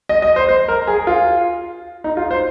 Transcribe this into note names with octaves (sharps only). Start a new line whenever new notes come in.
D#5
D#5
C5
C5
A#4
G#4
F4
D#4
F4
C5